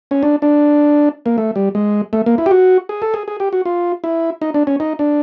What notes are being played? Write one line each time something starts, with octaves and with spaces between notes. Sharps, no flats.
C#4
D4
D4
A#3
A3
G3
G#3
A3
A#3
E4
G4
F#4
G#4
A4
G#4
G#4
G4
F#4
F4
E4
D#4
D4
C#4
D#4
D4